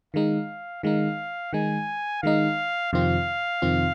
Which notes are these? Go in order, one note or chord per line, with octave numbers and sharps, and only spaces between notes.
D#3 G#3 D#4 F5
D#3 G#3 D#4 F5
D#3 G#3 D#4 G#5
D#3 G#3 D#4 F5
F2 C3 D#3 C4 F4 F5
F2 C3 D#3 C4 F4